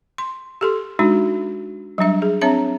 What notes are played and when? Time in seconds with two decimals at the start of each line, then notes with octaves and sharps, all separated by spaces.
0.18 C6
0.61 G4 A4 C6
0.99 G#3 D4 D#4 F#4
1.98 F#3 G3 D4 E5
2.22 G#4
2.42 C4 D4 C#5 E5 A#5